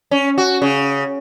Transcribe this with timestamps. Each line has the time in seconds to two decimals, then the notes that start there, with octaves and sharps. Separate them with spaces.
0.11 C#4
0.38 F#4
0.62 C#3